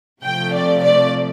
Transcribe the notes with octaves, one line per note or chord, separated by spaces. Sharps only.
C3 F3 A3 G5
D5
D5